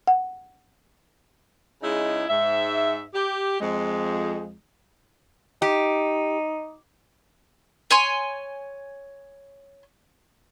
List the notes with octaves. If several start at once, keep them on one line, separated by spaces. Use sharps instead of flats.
F#5
C#3 G#3 D#4 E4
G#2 E5
G4
F2 G#3
D#4 G4
C#5 G#5 C6